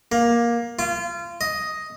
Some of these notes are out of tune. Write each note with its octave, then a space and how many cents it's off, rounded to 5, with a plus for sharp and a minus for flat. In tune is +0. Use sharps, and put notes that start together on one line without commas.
A#3 +15
F4 -25
D#5 +5